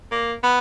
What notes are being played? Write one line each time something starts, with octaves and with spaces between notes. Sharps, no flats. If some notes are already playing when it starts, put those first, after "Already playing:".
A#3
B3